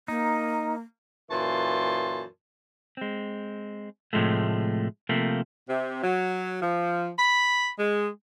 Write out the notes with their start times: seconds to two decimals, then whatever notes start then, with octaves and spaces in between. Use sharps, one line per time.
0.08 A#3 D#4
1.31 F#2 A#2 E3 A5 C6
2.97 G#3 C4
4.13 A2 C3 F3 G#3 A3
5.09 C3 F3 A3 A#3
5.70 C3
6.02 F#3
6.62 F3
7.18 B5
7.79 G#3